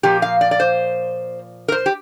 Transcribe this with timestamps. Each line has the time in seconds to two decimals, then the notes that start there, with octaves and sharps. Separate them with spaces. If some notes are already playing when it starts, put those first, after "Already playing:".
0.03 A#2 F3 A#3 G4
0.22 F5
0.41 D5
0.51 D5
0.60 C5
1.68 A#4
1.72 C5
1.86 G4